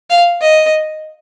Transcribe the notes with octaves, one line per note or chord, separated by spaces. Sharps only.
F5
D#5